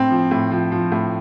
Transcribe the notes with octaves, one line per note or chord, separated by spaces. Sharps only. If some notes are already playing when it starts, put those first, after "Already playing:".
Already playing: A2 C4
F3
A2
F3
F3
A2